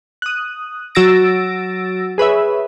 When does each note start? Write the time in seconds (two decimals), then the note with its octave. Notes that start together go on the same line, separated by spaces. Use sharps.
0.22 D#6 F#6
0.95 F#3 F#4 E6 A6 A#6 D7
2.18 G#4 B4 C#5 E5